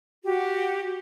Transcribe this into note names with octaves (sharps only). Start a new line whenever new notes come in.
F#4 G4